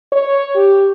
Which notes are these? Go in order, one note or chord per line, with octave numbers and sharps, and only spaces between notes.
C#5
G4